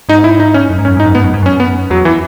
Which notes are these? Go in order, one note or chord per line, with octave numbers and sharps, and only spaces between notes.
G#2 D#4
E4
D#4
C#4
F#2
G#2
C#4
F#2
G#2 D#4
F#2
G#2 B3
F#2
G#2
F#2 C#4
B3
E2 F#3
E3